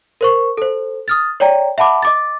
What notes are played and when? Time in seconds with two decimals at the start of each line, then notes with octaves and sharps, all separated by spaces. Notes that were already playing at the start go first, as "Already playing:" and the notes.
0.21 A#4 C5 C#6
0.57 A4 C5
1.08 D#6 F6 A6
1.40 C#5 D5 G5 A#5
1.78 E5 F#5 A5 B5 D6
2.02 D#5 D6 A6